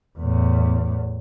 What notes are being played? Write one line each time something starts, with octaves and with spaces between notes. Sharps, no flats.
E2 A2